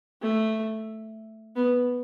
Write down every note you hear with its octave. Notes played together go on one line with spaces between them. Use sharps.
A3
B3